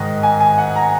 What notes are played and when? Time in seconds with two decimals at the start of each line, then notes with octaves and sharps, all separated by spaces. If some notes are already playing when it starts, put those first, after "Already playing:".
Already playing: G#2 D#3 D#5
0.23 G#5
0.40 G#5
0.58 F#5
0.76 A#5